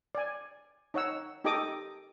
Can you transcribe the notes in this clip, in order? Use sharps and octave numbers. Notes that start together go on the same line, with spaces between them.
D5 G#5
D#4 C#5 F#5 E6
D#4 G4 A4 D#5 D6 D#6